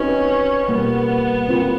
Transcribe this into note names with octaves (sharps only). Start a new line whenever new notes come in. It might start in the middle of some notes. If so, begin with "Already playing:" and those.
Already playing: C4 C#4 D#4 F#4 B4 D#5
B2 G3 A#3 B3
C4 F4 A#4